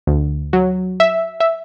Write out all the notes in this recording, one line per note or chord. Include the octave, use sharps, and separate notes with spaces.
D2
F#3
E5
E5